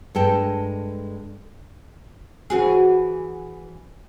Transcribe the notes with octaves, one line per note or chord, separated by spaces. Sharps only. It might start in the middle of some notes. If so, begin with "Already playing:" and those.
G2 G#3 A4 G5
E3 F#4 G#4